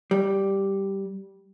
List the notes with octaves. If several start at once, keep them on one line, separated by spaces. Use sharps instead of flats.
G3